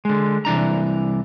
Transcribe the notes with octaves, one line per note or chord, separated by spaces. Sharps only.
D3 G#3
C2 E3 D4 A#5